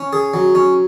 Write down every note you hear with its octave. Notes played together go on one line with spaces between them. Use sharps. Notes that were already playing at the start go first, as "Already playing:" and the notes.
Already playing: C#4
G#4
F#3
C#4